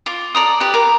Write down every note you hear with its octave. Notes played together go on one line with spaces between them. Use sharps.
F4 D6
A4 D5 A#5 D#6
G4 B4
A#4 D6